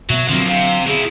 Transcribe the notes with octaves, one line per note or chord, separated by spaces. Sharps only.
B2 F#3 B3 E5
D3 F3 F#3 A#3 C4
C3 F5
B2 E4 G#4